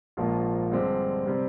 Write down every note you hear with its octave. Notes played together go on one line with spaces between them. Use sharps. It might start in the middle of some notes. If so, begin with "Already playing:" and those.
A#1 G#2 F3 A#3 F4
G2 D3 G#3 C4 G4
C3 G3 C4